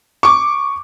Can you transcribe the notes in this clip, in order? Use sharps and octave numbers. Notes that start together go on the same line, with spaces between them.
C#6 D6